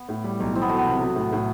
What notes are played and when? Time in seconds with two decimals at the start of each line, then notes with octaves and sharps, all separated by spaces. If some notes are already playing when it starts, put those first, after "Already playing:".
Already playing: B3
0.09 A2
0.24 G3
0.40 B1
0.55 E3 C4
0.62 B3
0.69 A3 F#4
0.77 B3
0.86 C3
1.01 F#3
1.16 A2
1.32 A2